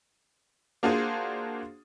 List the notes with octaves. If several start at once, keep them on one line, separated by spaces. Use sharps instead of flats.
A#3 D4 F4 F#4 G#4 C5